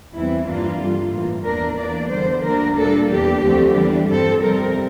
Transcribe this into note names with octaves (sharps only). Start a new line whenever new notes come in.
E2 E3 G3 C4 E4
G2 E3 A#3 D4 F4
G2 D3 G3
A2 E3 A#3
E2 E3 A#3 D4 A#4
E2 E3 A#3 D4 D5
E2 D3 G3 C5
D2 D3 G3 A#3 D4 A#4
A#2 G3 A#3 D4 A4
E2 E3 G3 D4 G4
D2 D3 F3 A3 C4
E2 E3 G3 D4
G2 F3 C4 A4
F2 C3 G3 C4 A#4